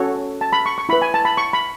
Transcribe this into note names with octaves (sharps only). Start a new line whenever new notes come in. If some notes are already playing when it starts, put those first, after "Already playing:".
Already playing: C#4 F#4 A4 C#5
A5
B5
C#6
C#6
E4 B4 B5
G#5
A5
B5
C#6
B5